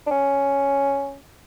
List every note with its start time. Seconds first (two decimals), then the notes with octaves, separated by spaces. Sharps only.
0.06 D4
0.11 C#4